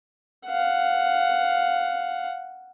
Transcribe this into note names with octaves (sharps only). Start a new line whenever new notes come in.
F5 F#5